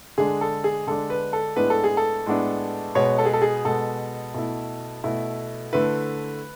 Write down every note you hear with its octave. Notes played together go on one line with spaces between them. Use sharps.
D3 G#3 D4 G#4
A4
G#4
D3 G#3 D4 A4
B4
A4
A2 G#3 B3 D4 B4
A4
G#4
A4
A2 G#3 B3 D4
B2 G#3 B3 C#5
A4
G#4
A4
G#4
B2 G#3 B3 A4
B2 A3 E4
B2 A3 E4
D3 A3 E4 B4